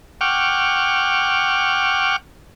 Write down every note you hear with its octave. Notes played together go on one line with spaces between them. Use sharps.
F#5 G5 C#6 D6 F6